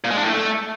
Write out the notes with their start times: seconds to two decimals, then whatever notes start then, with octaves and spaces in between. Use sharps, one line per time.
0.04 A#2
0.11 G#3
0.17 D4
0.23 A2
0.29 A3